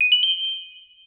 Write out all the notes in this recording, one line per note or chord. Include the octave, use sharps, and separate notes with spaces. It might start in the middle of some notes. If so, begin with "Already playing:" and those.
D#7
F#7
G7